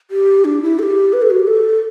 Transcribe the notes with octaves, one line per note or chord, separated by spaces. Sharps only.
G4
D4
E4
A4
G4
B4
A4
F#4
G4
A4